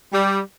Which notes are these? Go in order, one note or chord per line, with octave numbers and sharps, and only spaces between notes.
G3